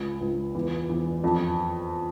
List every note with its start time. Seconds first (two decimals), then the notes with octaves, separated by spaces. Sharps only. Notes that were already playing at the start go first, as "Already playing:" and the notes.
Already playing: C#2
0.21 C#2
0.55 E2
0.89 E2
1.24 F2